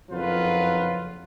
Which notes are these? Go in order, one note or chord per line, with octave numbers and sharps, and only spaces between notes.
F#1 F2 F#3 F4 B4